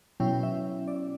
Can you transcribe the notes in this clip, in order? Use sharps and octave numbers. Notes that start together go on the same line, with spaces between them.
B2 F#3 C#4 E4 G5
E5
D5